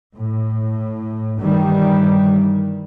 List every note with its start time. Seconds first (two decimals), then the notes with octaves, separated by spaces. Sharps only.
0.17 A2
1.38 G2 D#3 E3 G3